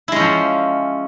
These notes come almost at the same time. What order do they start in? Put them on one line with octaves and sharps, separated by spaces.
E4 G#3 C#4 F3